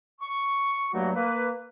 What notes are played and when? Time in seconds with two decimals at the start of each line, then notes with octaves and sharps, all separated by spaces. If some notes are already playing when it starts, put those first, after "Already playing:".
0.21 C#6
0.93 G2 F#3 A3 A#3 F#4
1.16 A#3 B4